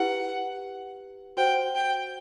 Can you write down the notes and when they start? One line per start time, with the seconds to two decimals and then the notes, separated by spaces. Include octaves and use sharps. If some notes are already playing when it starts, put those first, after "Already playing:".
Already playing: E4 G4 B4 F#5
1.37 F#4 C5 F#5 G5
1.75 G5